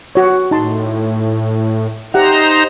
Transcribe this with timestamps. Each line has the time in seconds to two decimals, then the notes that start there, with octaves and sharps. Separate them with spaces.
0.15 F#4 C#5
0.51 A2 D#4 A5 C6
2.14 D#4 G4 C5 E5 F#5 A#5